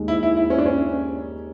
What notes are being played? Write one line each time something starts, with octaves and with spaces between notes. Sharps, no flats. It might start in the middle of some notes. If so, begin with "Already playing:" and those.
Already playing: D#2 D#3 G#3
E4
E4
E4
C#4
D4
C#4